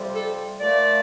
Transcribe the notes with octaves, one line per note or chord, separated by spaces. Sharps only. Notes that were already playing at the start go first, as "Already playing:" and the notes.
Already playing: F2 C3 G3
A4
A#2 F3 A3 D5